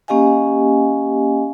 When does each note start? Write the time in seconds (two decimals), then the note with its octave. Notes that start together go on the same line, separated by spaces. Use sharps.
0.08 A#3 C#4 G4 D#5 F5 G#5